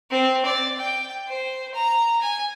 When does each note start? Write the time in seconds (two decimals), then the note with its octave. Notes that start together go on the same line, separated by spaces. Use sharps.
0.10 C4
0.45 D5
0.78 G5
1.28 C5
1.74 A#5
2.21 G#5